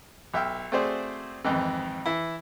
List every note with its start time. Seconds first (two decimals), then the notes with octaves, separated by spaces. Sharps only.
0.34 B1 E5 G5 F6
0.72 A3 C4 F#4 G#4 C5 D5
1.44 F2 G#2 D#3 E3
2.06 E3 E4